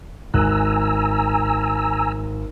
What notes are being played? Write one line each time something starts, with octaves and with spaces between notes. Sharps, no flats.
G#1 G#5 A#5 E6 F#6